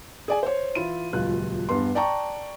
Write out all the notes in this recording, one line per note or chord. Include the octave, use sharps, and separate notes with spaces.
G#4 D5 G#5
C5 C#5
E3 E4 F4 D#7
D#1 C#2 F#3 F4 F#6
E2 G2 B3 C6
D5 G5 A5 A#5 C#6